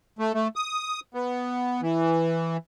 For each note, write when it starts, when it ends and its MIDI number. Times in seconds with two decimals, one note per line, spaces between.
0.19 0.33 57
0.34 0.48 57
0.56 1.00 87
1.14 1.81 59
1.82 2.57 52